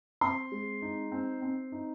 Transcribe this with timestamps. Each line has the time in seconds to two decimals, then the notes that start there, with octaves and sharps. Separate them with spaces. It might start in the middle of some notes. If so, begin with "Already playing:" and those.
0.21 C4 C6
0.52 G#3
0.82 D#4
1.12 C4
1.42 C4
1.72 D#4